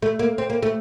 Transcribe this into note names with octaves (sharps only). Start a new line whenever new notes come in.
A3
A#3
C4
A#3
A3